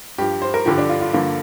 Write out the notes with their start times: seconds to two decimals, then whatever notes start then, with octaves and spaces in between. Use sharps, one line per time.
0.18 G2 F3 G4
0.42 C5
0.54 A#4
0.65 G2 D3 F3 G4
0.78 D4
0.89 F4
1.01 F4
1.13 G2 D3 F3 A#3